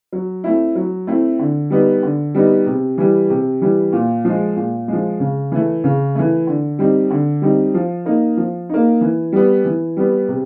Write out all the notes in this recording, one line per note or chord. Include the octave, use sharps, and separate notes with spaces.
F#3
A3 C4 E4
F#3
A3 C4 E4
D3
G3 B3 D#4
D3
G3 B3 D#4
C3
E3 G3
C3
E3 G3
A#2
F3 G#3
A#2
F3 G#3
C#3
E3 A3
C#3
E3 A3
D3
G3 C4 D#4
D3
G3 C4 D#4
F3
A#3 D#4
F3
A#3 D#4
E3
G3 B3
E3
G3 B3
C3